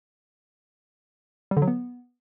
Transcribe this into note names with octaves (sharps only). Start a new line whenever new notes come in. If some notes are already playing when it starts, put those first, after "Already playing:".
G3
D3
F#3
B3